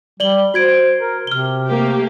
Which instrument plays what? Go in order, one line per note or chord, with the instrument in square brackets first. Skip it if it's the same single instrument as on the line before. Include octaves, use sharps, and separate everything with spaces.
[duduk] G3 [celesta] D5 F#7 G7
[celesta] F#4 G#6 D7 [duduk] C5
[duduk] A#4
[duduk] C3 [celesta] F6 G7
[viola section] A3 A#3 G4